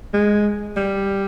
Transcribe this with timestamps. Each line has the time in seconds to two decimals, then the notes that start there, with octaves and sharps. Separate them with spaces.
0.14 G#3
0.77 G3